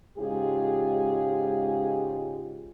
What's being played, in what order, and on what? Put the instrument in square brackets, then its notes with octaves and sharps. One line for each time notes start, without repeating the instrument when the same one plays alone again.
[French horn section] G#2 C#3 G#3 F4 G4 G#4